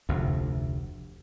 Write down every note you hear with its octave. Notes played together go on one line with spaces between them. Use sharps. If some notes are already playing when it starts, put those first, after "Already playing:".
F1 D2